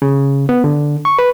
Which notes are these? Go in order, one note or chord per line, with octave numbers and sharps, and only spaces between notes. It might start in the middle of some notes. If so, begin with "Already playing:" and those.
C#3
B3
D3
C#6
B4